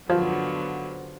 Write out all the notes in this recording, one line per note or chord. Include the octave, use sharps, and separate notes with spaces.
D3 F3 F#3 B3